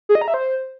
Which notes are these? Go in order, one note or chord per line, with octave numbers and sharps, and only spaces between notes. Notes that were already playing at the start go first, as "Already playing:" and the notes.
G#4
D#5
A#5
E5
C5